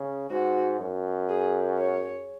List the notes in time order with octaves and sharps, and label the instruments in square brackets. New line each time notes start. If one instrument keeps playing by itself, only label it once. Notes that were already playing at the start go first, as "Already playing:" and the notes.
Already playing: [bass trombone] C#3
[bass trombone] G#2 [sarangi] F#4
[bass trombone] F#2
[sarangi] G#4
C#5